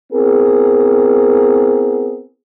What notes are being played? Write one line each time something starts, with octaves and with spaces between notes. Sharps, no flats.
B3 C4 E4 G#4 A#4